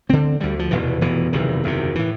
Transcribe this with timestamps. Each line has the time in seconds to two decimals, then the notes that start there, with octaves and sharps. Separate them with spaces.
0.09 D2 D3 C4
0.40 D2 D3 G3
0.59 F3
0.71 F1 E2 B2 E3
1.01 F1 E2 B2 E3
1.33 F#1 E2 C3 D#3
1.64 F#1 E2 C3
1.95 A2 E3